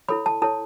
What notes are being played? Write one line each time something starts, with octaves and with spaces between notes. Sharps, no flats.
E4 A4 C#5 B5
A5
E4 A4 C#5 A5